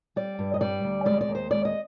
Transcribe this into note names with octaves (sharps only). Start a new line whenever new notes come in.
G3 D5
G2
D#5
G3 D5
D2
G#3 D5
D5
D#2
C5
G#3 D5
D#5